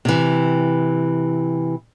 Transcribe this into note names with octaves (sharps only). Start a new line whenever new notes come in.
C3 E3